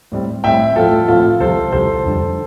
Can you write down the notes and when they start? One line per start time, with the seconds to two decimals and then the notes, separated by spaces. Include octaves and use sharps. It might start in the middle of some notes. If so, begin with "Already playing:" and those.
0.12 A2 G3 C4
0.44 A2 G3 C4 E5 G5
0.76 A2 F3 A3 C4 F4 A4
1.08 A2 F3 A3 C4 F4
1.40 C2 C3 F3 A4 C5
1.72 C2 C3 F3 A4 C5
2.05 F2 D3 G3